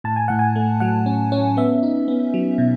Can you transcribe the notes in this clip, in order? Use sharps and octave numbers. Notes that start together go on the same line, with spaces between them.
A2 A5
G#5
A2 F#5
G#5
A3
F#3 F#5
C#4
C#4
B3 E5
D#4
B3
F#3
B2